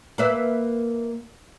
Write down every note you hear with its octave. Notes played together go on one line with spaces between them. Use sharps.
A#3 B4 E5